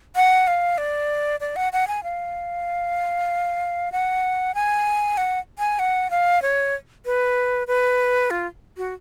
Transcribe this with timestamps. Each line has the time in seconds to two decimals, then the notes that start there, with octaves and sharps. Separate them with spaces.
0.16 F#5
0.47 F5
0.78 D5
1.40 D5
1.56 F#5
1.73 F#5
1.88 G#5
2.03 F5
3.92 F#5
4.55 G#5
5.17 F#5
5.59 G#5
5.79 F#5
6.10 F5
6.42 C#5
7.05 B4
7.67 B4
8.30 F4
8.77 F#4